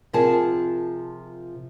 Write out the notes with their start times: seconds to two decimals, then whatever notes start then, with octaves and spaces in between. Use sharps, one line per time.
0.13 C3 F3 F4 G#4 A#4 A5